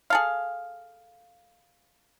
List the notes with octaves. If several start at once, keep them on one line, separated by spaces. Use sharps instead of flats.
G#4 A4 F5